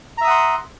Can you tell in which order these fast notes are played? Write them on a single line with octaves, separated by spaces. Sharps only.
A#5 E5 D#6 F#5 C6